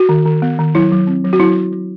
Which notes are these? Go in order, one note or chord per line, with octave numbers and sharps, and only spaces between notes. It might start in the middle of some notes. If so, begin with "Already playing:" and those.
Already playing: F#4
D#3
D#3
B3
D#3
F#3 E4
F#3
C4
F#3
F#4
F#3 E4
F#3
F#3